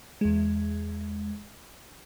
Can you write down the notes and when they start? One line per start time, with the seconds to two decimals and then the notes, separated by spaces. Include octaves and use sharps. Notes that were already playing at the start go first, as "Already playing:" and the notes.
0.21 E2 G#3